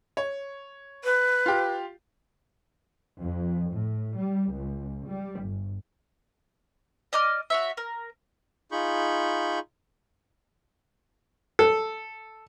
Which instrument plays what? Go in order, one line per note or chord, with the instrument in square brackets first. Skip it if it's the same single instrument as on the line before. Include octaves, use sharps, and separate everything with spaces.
[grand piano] C#5
[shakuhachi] B4
[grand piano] F4 G4
[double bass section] F2
A2
G3
C#2
G3
G1
[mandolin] D5 D#5 D6 F6
F#4 C#5 E5
A#4
[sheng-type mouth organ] D#4 F4 G#4 B5 C#6 G6
[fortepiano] A4